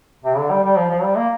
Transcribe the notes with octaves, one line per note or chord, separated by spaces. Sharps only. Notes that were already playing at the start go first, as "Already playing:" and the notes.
C3
D3
G3
G3
F3
F3
G3
A#3